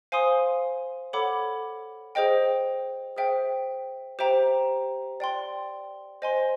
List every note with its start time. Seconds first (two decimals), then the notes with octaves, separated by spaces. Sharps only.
0.12 C5 F5 G#5 C6 D#6
1.13 A4 C#5 F#5 B5 D6
2.15 G#4 C5 D#5 G5
3.17 G#4 C5 E5 G5
4.19 G4 C5 E5 G5 A#5
5.20 D5 G5 C6
6.22 C5 D#5 G#5 C6